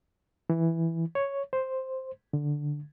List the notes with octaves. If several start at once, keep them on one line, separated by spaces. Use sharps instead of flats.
E3
C#5
C5
D3